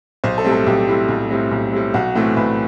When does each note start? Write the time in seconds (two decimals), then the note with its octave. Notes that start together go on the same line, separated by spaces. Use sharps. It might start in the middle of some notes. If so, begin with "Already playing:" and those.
0.24 B1 C5
0.38 A4
0.44 A2 G3 C4
0.52 A4
0.66 B1 G4
0.87 A2 G3 C4 E4
1.08 B1
1.30 A2 G3 C4
1.51 B1
1.72 A2 G3 C4
1.94 B1 F#4
2.15 A2 E3 A3 C4 F#4
2.36 B1 B4